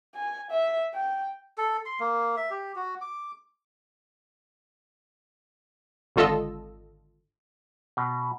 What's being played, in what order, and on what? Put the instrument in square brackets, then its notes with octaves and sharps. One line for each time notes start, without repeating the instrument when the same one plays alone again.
[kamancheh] G#5
E5
G5
[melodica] A4
C6
A#3
E5
G4
F#4
D6
[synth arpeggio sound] G#1 D3 F4 A4 D#5 E6
[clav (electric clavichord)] B2